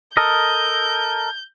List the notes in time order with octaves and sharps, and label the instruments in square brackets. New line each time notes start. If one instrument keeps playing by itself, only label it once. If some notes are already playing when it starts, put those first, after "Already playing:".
[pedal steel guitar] A4 A#4 D#5 [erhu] G6